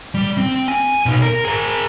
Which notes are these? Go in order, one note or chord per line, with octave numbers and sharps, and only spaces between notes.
G3
C4
G#5
B2 D#4
A#4
G#4 A#4